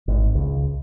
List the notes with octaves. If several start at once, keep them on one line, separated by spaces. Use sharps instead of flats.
G#1
C#2